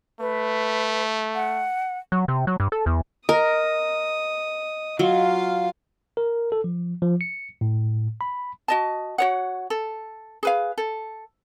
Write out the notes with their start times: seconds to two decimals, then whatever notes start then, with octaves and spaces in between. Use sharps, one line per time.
0.20 A3 B4
1.35 F#5
2.12 F#3
2.28 C3
2.47 F#3
2.60 G2
2.72 A4
2.86 E2
3.29 A#4 D#5 D#6
4.99 F#3 F4 F5
6.17 A#4
6.52 A4
6.64 F3
7.02 F3
7.21 C#7
7.61 A2
8.21 B5
8.68 F#4 D#5 A5
9.18 F#4 C#5 F#5
9.70 A4
10.43 G#4 B4 F5
10.78 A4